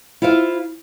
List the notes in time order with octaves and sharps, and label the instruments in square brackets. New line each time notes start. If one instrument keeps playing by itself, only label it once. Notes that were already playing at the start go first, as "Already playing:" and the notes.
[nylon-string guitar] E4 F4 C5 E5 F5